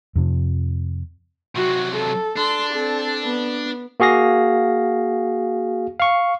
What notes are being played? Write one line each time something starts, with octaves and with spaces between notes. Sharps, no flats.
F2 C3 F3
C3 F#3 F#4
A4
D4 A4 C6
C4 A4
B3
A#3 F#4 G#4 F5 A#6
F5 C#6